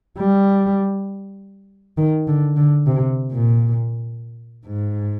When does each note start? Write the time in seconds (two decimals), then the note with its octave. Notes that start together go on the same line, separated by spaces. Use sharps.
0.18 G3
1.98 D#3
2.28 D3
2.57 D3
2.86 C3
3.32 A#2
4.66 G#2